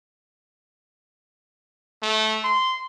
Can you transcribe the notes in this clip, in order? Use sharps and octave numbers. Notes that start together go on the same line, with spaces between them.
A3
C6